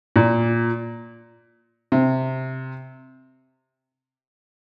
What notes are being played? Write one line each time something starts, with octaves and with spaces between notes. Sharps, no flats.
A#2
C3